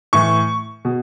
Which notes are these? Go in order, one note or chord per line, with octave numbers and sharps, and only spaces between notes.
A2 E3 C#6
B2